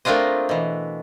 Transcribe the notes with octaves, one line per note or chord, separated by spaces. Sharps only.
A3 A#3 C4 D4 F4 D#5
B2 E3